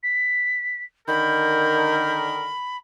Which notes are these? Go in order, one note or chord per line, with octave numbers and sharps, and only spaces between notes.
B6
D3 D#3 A#4 B5 G6